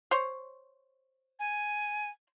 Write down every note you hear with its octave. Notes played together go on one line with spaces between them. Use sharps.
C5 C#5
G#5